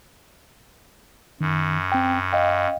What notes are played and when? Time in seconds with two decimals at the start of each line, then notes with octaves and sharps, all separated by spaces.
1.41 F#2 D#3
1.92 C4 G5
2.33 D#5 F5 G5